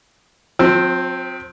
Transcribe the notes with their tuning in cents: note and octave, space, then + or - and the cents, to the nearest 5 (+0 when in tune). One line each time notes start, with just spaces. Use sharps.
F3 +45 C4 +0 E6 +0